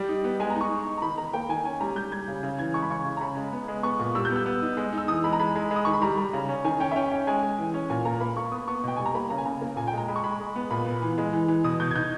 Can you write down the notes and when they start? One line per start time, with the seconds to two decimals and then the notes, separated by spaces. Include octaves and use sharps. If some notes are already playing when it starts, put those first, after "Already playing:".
Already playing: G3 G5
0.09 D#4
0.24 B3
0.40 G#3 G#5
0.50 A#5
0.55 D#4
0.61 C#6
0.71 D#4
0.87 D#4
0.97 A#5
1.02 D#3 B5
1.18 D#3 A#5
1.33 A#3 G5
1.49 D#3 G#5
1.65 C#4 G#5
1.81 G3 A#5
1.96 G3 G6
2.12 G3 G#6
2.28 C#3
2.43 C#3
2.59 E3 G#6
2.74 G#3 C#6
2.83 B5
2.90 C#3 C#6
3.05 C#3
3.17 A#5
3.21 C#3 B5
3.36 G#3
3.52 B3
3.68 G#3
3.83 B3 C#6
3.99 A#2
4.15 G3 E6
4.25 G6
4.30 B3
4.36 E6
4.46 B3
4.62 D#4
4.77 G#3
4.93 D#4
4.98 E6
5.08 E3 D#6
5.24 G#3 B5
5.33 A#5
5.40 G#3 B5
5.55 G#3
5.71 G#3
5.76 D#6
5.85 D#3 C#6
5.93 B5
6.02 G3 A#5
6.17 G3
6.33 C#3
6.49 C#4
6.64 D#3 G#5
6.80 C#4 G5
6.91 E5
6.96 C#4 G5
7.11 C#4
7.27 G#3 G#5
7.43 G#3
7.58 E3
7.74 C#4
7.90 A#2 G#5
8.05 A#3 A#5
8.21 A#3 B5
8.37 A#3 C#6
8.52 B3 D#6
8.67 B3 C#6
8.83 B2 G5
8.97 G3 G#5
9.06 A#5
9.15 A#3 B5
9.30 C#3 A#5
9.38 G#5
9.45 C#3 A#5
9.61 A#3
9.77 A#2 G#5
9.87 G5
9.93 G#3 A#5
10.08 G#3 B5
10.16 C#6
10.24 G#3 B5
10.39 G#3
10.56 B3
10.71 A#2 B5
10.86 B3
11.02 E3
11.18 G#3
11.33 E3
11.48 E3
11.64 B2 D#6
11.80 B2 G6
11.91 G#6
11.95 D#4 G6